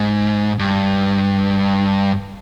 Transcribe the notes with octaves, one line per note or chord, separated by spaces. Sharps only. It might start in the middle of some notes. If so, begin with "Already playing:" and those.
Already playing: G#2
G2